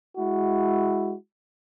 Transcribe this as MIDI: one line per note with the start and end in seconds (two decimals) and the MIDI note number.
0.17 1.14 56
0.17 1.14 64
0.17 1.14 66